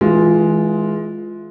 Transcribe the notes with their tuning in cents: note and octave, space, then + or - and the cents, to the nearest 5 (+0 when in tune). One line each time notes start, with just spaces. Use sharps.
E3 -20 G#3 +10 F4 +0